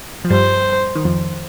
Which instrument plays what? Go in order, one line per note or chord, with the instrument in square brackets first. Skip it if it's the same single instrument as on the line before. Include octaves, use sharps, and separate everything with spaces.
[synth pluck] F3
[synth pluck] G2 G3 [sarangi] C5
[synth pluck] D#3
F2 F3